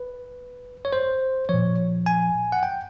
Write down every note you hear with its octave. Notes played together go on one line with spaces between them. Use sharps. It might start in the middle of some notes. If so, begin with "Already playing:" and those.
Already playing: B4
C#5
C5
A#2 F3 C#5
G#5
F#5
G5